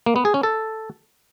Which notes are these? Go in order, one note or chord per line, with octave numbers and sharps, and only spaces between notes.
A#3
B3
G#4
C#4
A4